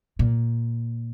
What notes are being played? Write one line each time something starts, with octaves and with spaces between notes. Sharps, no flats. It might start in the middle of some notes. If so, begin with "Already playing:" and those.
A#2